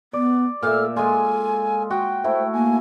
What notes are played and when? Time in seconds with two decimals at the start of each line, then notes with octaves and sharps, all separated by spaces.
0.13 B3 D5
0.63 A#2 A4 E5 F6
0.96 G#3 F4 A4 G#5
1.90 F#4 G5
2.24 A3 E4 C5
2.53 A#3 G#5